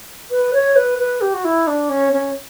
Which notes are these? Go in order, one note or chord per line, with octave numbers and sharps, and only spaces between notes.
B4
C#5
B4
B4
G4
F#4
E4
D4
C#4
C#4